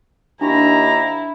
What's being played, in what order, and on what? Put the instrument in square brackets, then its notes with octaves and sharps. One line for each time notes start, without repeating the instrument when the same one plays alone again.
[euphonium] D#2 [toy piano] D4 G4 C6 [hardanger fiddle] E4 [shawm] A#5